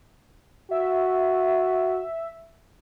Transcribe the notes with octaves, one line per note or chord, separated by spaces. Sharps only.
F#4 E5